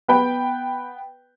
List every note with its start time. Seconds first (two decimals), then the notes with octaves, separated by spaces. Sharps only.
0.08 B3 B4 G5 B5